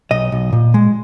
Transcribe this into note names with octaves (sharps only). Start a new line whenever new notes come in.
B1 D#5
B1
A#2
G#3